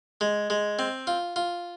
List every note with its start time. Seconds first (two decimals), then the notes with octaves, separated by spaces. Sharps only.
0.21 G#3
0.50 G#3
0.79 C4
1.07 F4
1.36 F4